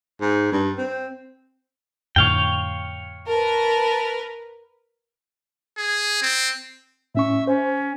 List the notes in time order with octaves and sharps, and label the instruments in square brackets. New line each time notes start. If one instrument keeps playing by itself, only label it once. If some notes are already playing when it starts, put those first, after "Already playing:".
[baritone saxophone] G#2
G2
C4
[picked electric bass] F2 A2 D3 [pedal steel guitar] C#5 F5 G5
[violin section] A#4 B4 [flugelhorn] A5
[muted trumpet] G#4
C4
[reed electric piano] A2 C#4 C#6 [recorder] E5
[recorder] C#4 [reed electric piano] C5